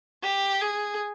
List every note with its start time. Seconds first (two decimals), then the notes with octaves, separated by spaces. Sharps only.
0.23 G4
0.61 G#4